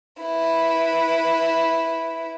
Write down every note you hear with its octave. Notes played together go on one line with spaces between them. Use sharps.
E4 B4